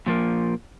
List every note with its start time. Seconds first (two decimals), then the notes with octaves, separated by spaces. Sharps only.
0.06 A#2 F3 A#3